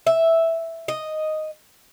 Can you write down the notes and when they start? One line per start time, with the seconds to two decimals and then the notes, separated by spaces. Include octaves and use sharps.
0.07 E5
0.88 D#5